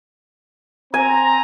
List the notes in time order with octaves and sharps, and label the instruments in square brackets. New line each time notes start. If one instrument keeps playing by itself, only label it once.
[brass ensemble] C4 A#5 [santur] G#5